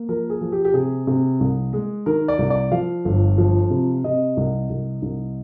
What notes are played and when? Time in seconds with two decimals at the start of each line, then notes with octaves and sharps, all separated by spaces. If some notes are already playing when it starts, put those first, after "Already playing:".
Already playing: A#3
0.09 F3 A#4
0.30 G#4
0.41 F3
0.52 G4
0.65 G4
0.74 C3 G#4
1.07 C3
1.40 C2
1.73 G#3
2.06 D#3 A#4
2.28 D5
2.39 C2
2.50 D5
2.71 F3 F5
3.05 G1
3.38 F3
3.70 C3
4.04 C3 D#5
4.37 C2
4.70 C2
5.02 C2